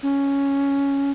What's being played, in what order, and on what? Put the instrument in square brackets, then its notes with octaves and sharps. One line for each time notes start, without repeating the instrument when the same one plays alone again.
[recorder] C#4